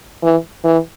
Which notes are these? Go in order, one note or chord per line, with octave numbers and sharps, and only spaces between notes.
E3
E3